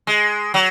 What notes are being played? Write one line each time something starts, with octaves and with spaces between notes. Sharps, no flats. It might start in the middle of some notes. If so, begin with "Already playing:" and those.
G#3
F#3